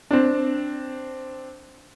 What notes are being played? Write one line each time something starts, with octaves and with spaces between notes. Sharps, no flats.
C4 D4